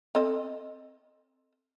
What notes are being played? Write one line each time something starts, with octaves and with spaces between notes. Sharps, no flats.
C4 A4 D#5